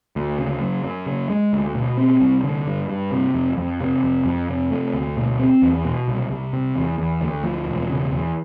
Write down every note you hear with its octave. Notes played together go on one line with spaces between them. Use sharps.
D2
C#3
F#2
F#2
C#3
G#3
D2
B2
C4
C2
D3
G2
G2
C3
F2
F2
C3
F2
F2
C3
A3
D2
B2
C4
E2
B2
C2
C2
C3
E2
E2
D2
F3
E1
C#3
E2